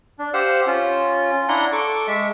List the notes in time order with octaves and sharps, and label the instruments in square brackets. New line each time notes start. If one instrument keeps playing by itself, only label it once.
[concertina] D4
G4 C5 F5 F#5 E6
C#4 F4
D4 E4 F#5 A#5 C6
A4 C#6 D6
G#3 E5